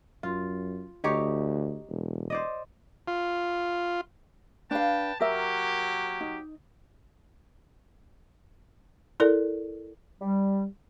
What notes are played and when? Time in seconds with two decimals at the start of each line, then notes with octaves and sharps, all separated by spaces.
0.23 F#2 F4
1.04 D2 D#4 G4 C#5
1.89 E1
2.30 C5 D5 D#5
3.08 F4
4.71 D4 B4 F5 G5 A5
5.21 F#3 A#3 G4 A#4 E5
6.21 D#4
9.20 E4 A4 A#4 D5
10.21 G3